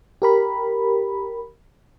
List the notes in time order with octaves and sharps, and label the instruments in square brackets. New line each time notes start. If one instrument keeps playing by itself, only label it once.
[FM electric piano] G4 A#4 B5